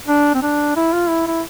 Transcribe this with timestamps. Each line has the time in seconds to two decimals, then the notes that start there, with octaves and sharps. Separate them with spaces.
0.08 D4
0.35 C4
0.42 D4
0.76 E4
0.93 F4
1.09 E4
1.27 E4